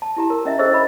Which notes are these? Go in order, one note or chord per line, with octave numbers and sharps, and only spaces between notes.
A5
E4 G4 A#5
A#4
C#4 D#5 E5
D4 G#4 A4 C5 D#5 E6
D#5 B5